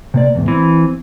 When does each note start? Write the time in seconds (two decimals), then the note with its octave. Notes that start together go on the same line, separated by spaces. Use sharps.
0.14 C3 A#3 D5
0.35 E2 G#2 C3
0.48 E3 C4